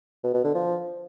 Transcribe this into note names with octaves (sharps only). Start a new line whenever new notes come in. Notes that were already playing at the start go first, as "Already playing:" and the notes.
B2
B2
D3
F3